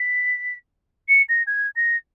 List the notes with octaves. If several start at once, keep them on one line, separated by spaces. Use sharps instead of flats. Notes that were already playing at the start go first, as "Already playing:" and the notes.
Already playing: B6
C#7
A#6
G#6
A#6